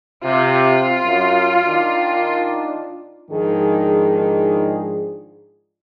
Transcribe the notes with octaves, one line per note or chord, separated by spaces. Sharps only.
C3 F4
F#2
D#3 D4
G#2 D#3 F3 D4 G#4